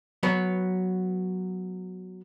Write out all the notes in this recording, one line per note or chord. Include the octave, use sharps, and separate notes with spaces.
F#3 B3 B4